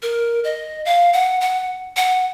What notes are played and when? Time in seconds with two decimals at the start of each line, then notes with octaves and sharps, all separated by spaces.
0.02 A#4
0.44 D#5
0.85 F5
1.13 F#5
1.41 F#5
1.96 F#5